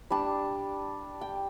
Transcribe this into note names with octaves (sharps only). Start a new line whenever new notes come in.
G3 D4 A5
G5